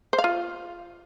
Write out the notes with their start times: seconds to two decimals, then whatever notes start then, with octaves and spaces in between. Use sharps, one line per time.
0.13 C5
0.19 F5
0.24 F4